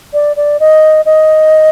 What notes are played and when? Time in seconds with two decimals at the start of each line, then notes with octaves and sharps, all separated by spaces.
0.13 D5
0.36 D5
0.60 D#5
1.06 D#5